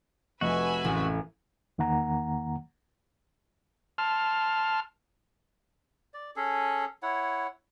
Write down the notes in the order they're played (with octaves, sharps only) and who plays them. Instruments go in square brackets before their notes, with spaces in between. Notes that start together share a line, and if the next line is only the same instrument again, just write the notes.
[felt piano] F1 F2 D#5 [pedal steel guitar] F#4 [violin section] B4 E5 G#5
[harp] A1
[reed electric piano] E2 D#3 A#3 F#5 A#5
[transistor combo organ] A5 C6 F6
[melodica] D5
C#4 G#4 A4
E4 C#5 F#5